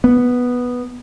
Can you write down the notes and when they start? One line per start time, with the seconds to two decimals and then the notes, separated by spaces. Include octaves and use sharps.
0.04 B3